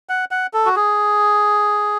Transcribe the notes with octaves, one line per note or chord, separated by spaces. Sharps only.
F#5
F#5
A4
F#4
G#4